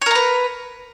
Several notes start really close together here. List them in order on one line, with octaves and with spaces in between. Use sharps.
C#5 A#4 A#5 B4